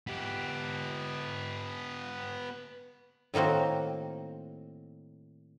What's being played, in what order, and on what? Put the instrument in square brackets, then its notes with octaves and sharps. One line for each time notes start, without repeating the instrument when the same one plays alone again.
[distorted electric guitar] B3 G4
[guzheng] A2 D#3 A#3 C4 F#4